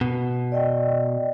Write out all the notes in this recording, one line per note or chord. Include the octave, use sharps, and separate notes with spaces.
B2
D5 D#5 G5